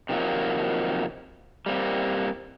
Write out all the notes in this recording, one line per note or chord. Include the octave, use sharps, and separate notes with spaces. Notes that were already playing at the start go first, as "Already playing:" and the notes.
C3 D#3 F3 F#3 A#3
G3 A#3 C4